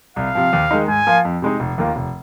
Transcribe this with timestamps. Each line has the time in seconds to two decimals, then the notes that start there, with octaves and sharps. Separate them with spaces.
0.16 C2 F5
0.35 C3 F3
0.53 D#2
0.71 D#3 G#3 D#4
0.88 G#2 G#5
1.07 F3 A#3 F4
1.25 F2
1.42 C3 G#3 D#4
1.60 F1
1.78 D#2 D#3 A#3 F4
1.96 F1